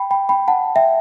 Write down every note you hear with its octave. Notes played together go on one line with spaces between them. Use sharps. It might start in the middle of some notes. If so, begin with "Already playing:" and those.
Already playing: G5 B5
G5 B5
G5 B5
F#5 A5
E5 G5